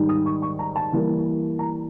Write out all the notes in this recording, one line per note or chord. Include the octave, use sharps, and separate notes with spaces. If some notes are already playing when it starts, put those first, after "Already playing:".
Already playing: G#2 D#3 G3
D#6
C#6
C#6
A#5
A5
E3 G3 A#3
A#5